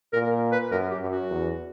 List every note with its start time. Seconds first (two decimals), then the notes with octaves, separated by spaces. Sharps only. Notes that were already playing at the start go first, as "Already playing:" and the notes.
0.13 A#2 A#4
0.52 B4
0.71 F#2 A#4
0.91 G4
1.01 F#2
1.11 F#4
1.30 E2